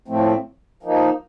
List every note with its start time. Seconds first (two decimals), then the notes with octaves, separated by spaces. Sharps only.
0.08 A2 F3 A3 C4
0.83 F3 A#3 D#4